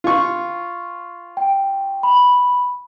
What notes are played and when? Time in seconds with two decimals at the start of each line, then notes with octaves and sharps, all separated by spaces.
0.04 F4 C#6
1.37 G5
2.03 B5